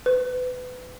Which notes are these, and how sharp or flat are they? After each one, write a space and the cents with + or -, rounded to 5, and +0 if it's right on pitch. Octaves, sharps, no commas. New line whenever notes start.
B4 +25